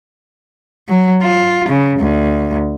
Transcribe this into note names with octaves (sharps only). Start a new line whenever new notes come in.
F#3
F4
C#3
D2